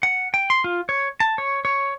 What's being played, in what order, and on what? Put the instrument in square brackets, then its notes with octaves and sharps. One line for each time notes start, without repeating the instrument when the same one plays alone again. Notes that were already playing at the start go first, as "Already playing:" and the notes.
[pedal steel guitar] F#5
G5
C6
F4
C#5
A5
C#5
C#5